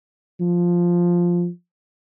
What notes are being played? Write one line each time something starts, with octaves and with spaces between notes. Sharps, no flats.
F3